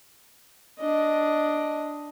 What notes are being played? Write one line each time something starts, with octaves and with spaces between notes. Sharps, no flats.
D4 D#5